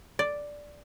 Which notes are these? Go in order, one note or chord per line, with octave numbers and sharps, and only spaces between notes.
D5